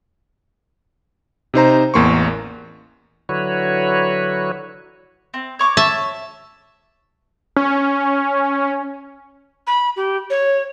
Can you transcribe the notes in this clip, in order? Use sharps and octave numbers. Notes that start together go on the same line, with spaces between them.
C3 D#4 C5 A#5
A1 E2 A#3 C6 C#6
D3 F#3 E4 F#4 B4 C#5
C4
C#5 C#6 D6
E5 A5
C#4
B5
G4
C#5